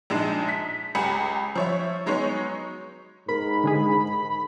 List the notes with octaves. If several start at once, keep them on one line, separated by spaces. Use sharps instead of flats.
A#1 G#3 D4 D#4 A5
B6
C#2 G4 G#5 A#5 B5 C#7
F3 C#5 E5
F#3 G#3 B3 D#4 C#5
G#2 A#4 B5
D3 G#3 G#4